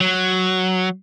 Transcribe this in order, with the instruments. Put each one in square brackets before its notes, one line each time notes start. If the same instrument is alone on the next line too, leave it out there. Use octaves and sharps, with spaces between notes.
[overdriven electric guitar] F#3